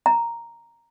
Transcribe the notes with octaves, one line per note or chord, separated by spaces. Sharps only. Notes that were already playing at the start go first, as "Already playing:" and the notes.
A#5